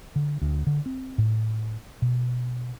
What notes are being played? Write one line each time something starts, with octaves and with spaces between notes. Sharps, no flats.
D3
D2
D3
C4
A2
B2